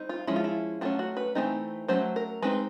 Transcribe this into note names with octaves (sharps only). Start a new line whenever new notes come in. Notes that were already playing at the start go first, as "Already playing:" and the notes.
Already playing: G3 C4 D#4
F4
F3 G#3 C#4 E4
F4
E4
F#3 A3 C#4 F4
F#4
B4
E3 A3 C4 D#4
F#3 A3 C#4 C5
A#4
G#3 C4 D#4 B4